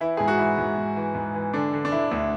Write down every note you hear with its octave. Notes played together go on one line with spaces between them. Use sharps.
E3 E4
G#2 G#4
F#4
E3 E4
G#2
G#2
E3
G#2
E3
D3 D4
D3
D4
D3 E4
D2